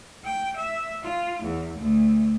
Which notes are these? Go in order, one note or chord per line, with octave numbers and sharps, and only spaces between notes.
G5
E5
F4
E2
D2